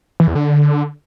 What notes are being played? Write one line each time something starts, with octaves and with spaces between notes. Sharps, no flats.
E3
E2
D3